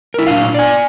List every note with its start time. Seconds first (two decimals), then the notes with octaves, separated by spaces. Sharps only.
0.14 E4 A#4
0.27 A#2 F#3 D4 F5
0.54 D5 G#5